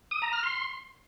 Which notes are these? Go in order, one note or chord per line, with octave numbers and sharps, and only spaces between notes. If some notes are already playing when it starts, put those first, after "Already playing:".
D#6
A#5
F6
C6